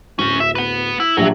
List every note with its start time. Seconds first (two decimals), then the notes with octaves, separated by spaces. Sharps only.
0.19 D1 C#4 F#4
0.40 E5
0.55 B4 F#5
1.00 E4
1.17 A#1 F#3 G4 E5